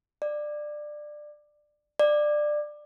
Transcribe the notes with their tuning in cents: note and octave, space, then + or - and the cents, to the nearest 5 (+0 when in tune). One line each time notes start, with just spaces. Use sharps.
D5 +20
D5 +20